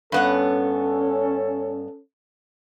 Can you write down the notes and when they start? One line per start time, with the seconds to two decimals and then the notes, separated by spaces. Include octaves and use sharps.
0.12 G2 B3 C#4 A4 F#5